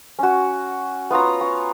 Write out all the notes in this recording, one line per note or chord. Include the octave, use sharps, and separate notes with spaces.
C#4 F#4
B3 F4 C#5 A#5
C#6